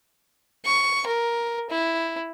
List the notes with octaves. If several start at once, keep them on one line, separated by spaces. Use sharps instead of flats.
C#6
A#4
E4